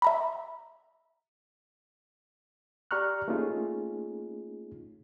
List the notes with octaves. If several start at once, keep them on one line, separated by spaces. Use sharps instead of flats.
E5 A#5 B5
G4 D5 A#5 C#6 F6 F#6
A3 A#3 C#4 D#4 F4 G#4